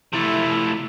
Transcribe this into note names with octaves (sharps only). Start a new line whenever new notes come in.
C3 A3 E4